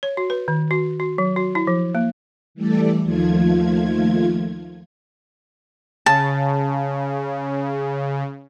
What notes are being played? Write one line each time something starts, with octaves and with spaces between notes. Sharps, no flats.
C#5
F#4
B4
D#3
F#4
F#4
F#3
F#4
E4
F3
A#3
E3 G3 A3 A4 D5
D#2 D#3 F3 A3 F4 G#6
C#3 A5